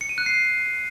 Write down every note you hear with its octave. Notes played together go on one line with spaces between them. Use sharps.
C#7
D#7
F#6
C7